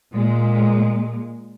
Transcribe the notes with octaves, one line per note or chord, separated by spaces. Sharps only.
A#2 G#3